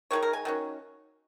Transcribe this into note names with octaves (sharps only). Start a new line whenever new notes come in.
D#3 G#3 D#4 C#5
A#4
G#5
D#3 F#3 C#4